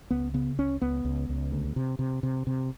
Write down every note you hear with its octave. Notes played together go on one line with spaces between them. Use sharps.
C#2 B3
C#3 B3
C#2 C#4
C#2 B3
C#2
C#2
D2
C3
C3
C3
C3